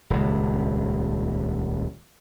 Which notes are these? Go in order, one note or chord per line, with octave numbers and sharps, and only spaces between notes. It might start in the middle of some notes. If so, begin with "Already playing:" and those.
D#1 C#2